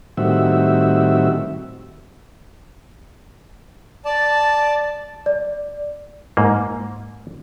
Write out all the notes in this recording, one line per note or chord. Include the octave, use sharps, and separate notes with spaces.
A2 D#3 G3 C4 F#4 E5
D5 A5
D5
G#2 A#3